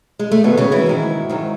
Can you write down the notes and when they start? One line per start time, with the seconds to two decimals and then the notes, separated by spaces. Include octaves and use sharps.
0.19 G#3
0.31 A3
0.43 G#2 B2 D#3 F#3 B3
0.57 C#3 C#4
0.72 E3 E4
0.86 G#2 D#3 F#3
1.30 G#2 D#3 F#3